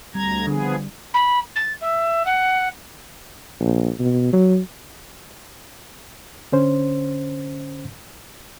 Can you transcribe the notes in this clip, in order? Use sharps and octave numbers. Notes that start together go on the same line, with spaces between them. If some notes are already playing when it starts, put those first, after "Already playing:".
D2 G3 C4 A#5 G#6
D3 F3 B3 G#4
B5
A6
E5
F#5
A#1
B2
F#3
D3 C#4 C5